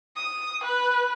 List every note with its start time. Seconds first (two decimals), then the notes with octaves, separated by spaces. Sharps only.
0.16 D#6
0.64 B4